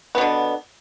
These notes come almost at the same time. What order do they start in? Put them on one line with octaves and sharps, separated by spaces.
B3 B2 D3